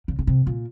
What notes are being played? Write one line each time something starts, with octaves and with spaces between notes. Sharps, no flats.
C#3
C#3
C3
A#2